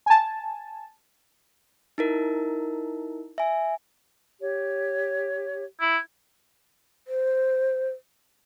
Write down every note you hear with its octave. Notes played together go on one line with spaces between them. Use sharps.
G#5 A5
D#4 E4 A#4
E5 G#5
G4 C#5
E4
C5